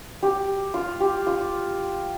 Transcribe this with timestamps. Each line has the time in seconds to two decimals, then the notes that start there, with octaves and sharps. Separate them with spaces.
0.23 G4
0.74 F4
1.00 G4
1.27 F4